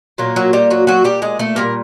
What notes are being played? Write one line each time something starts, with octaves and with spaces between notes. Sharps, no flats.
A#2 F#3 A#3
F#3 F#4
G3 G4
F#3 F#4
F#3 F#4
G3 G4
G#3 G#4
A3 A4
A#2 G3 A#3 A#4